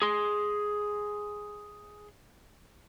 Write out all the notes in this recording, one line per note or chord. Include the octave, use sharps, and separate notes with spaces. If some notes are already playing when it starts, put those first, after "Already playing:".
G#4 C6